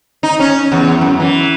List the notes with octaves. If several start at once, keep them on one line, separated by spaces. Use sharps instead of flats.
D#4
C#4
E2
F#2
E3